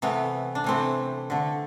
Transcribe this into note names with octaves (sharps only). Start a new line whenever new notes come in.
C3 E3 A3 B3
D4
C3 E3 A3 C4
D3 A3